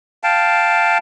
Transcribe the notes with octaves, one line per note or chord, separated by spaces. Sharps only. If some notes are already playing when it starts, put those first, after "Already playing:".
F5 G5 A5